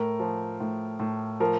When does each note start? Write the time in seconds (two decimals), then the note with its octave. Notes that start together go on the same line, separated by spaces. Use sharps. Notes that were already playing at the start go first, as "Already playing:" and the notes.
Already playing: A2 A#4
0.20 F3
0.60 A2
1.00 A2
1.40 F3 A#4